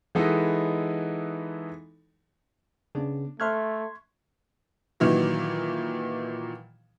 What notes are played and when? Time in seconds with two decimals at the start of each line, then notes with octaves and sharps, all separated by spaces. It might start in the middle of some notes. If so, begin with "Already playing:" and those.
0.15 E3 G#3 B3 D#4 E4 A4
2.95 C#3 B3 D4
3.40 A3 E5 C6 C#6 F6 F#6 G#6
5.00 A#2 D#3 E3 F#3